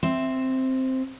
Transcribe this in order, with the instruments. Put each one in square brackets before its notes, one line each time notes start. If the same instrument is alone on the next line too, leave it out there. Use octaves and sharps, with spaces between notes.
[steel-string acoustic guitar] C4 E5